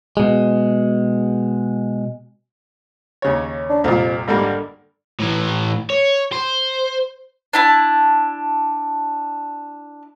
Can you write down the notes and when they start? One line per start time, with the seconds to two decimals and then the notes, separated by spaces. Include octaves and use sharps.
0.17 B2 G#3
3.22 D#2 C#3 C#5
3.70 D4
3.84 C2 F2 A#2
4.28 G#1 D3 G3 A#3
5.20 A2 E3
5.90 C#5
6.32 C5
7.53 D4 E4 A5